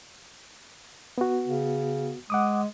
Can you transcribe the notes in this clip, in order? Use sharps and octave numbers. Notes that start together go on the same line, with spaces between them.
B3 F#4
C#3
G#3 F#5 D6 D#6